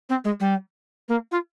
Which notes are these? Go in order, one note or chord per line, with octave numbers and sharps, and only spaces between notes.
C4
G#3
G3
A#3
F4